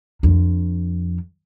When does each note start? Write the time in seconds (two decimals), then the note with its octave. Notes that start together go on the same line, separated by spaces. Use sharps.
0.23 F2 D4